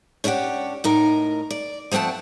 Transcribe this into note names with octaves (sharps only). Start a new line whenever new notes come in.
C#4 D4 E4 G4 F#5
A2 D#4 A#4
D5
F3 A3 C4 F#5 A5